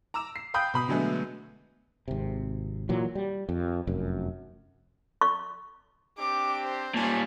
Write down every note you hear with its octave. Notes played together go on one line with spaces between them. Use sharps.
A#5 D6 E6 E7
C7
F5 G5 B5 D#6 G6
B2 B5 D#6
B2 D3 F#3 G#3 A3 B3
G#1 C3
A#2 E3 F#3
G3
F2
F1 F#2
C#6
C4 D4 G4 D6
C5
A#2 G3 C#5 G#5 A5